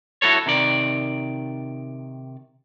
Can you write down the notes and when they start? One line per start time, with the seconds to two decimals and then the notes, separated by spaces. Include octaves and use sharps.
0.22 E4 F#4 A4 C#5
0.46 C3 D#3 D5